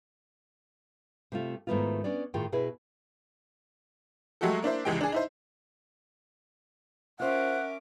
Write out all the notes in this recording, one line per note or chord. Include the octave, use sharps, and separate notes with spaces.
C3 A3 F4
G#2 D#3 A3 B3 E4 F4
B3 C#4 D4 D5
A2 D#3 F4 G#4 G5
B2 E4 G#4 B4 D#5
F#3 G#3 A3 F#4 G4 A4
A#3 D4 E4 C5
F1 C#2 E3 G#3 G4 G5
D4 G#4
D#4 E4 C5
C#4 F4 A#4 C5 E5 F#5 D6